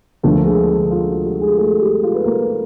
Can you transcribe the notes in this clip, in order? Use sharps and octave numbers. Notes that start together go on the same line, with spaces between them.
D2 D3 F3 A3 A#3 A4
G#3 G#4
F4
F#4
G3 G4
G#3 G#4
A3 A4
G3 G4
F4
B4
A#3 A#4